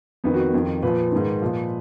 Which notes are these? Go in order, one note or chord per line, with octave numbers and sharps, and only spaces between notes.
F2 D#3 B3
F#4
F2 D#3
A#2 F3 B4
G#2 D#3
A#2 F3